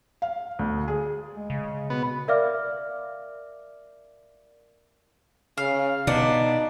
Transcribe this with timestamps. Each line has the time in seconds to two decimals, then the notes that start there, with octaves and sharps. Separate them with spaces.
0.22 F5
0.59 D2
0.88 G#4
1.35 G#3
1.50 C#3
1.90 B2 B3
2.28 A#4 D5 E5 F5 D6 F6
5.58 C#3 F5
6.07 B2 D4 D#4